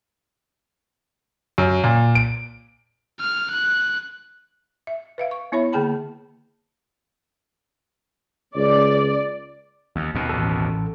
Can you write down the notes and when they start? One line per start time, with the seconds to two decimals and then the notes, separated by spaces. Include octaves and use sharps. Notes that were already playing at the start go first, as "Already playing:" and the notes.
1.58 F#2
1.84 A#2
2.15 D7
3.20 F6
3.51 F#6
4.87 E5
5.18 B4 E5 F5
5.31 C#6
5.52 B3 E4 C#5 E5 B5
5.72 D3 A#3 G#4 G5 A5 B5
8.56 C#2 D5
9.96 D#2
10.15 D#2 B2
10.29 A1 A4